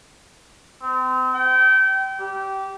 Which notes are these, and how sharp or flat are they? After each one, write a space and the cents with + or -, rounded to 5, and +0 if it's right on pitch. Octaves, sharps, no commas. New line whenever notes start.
C4 -35
G5 -30
G4 -20